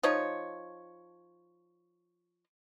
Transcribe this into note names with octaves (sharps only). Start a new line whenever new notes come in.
F3 D#4 C#5